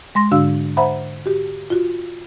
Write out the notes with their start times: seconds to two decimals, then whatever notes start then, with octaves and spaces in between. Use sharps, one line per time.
0.15 G#3 C6 A#6
0.31 G#2 D3 D4 F#4 F5 E6
0.77 C5 E5 F#5 A#5 B5
1.26 F#4 G4
1.70 F4 F#4